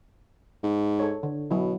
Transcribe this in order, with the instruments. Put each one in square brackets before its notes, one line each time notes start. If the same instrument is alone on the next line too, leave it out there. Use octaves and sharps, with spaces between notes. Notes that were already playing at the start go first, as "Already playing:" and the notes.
[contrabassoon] G#2
[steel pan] A4 C#5
D3
[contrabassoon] B2 [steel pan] F#3 E4